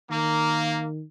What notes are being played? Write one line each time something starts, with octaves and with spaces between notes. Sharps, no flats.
D#3 A#3